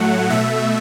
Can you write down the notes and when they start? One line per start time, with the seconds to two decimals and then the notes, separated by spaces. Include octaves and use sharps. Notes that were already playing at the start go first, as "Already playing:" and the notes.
Already playing: A2 F#3 A3 F#5
0.30 B2 A3 E5